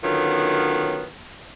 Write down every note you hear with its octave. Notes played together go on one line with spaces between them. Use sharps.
D3 D#3 F#3 B3 C#4 F4